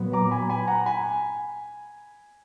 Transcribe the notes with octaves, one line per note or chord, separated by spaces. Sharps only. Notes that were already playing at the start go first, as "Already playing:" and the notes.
Already playing: A#2 F#3 B3
A#5 D6
G#5 B5
G#5 B5
F#5 A#5
G#5 B5